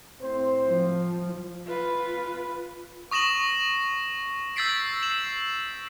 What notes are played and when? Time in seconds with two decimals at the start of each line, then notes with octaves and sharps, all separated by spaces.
0.22 A2 C4 C5
0.69 F3
1.66 F4 B4
3.11 C#6 D#6 A#6 E7 F#7
4.56 E6 G6 A6 B6 C7 D7
5.02 C7 E7 F#7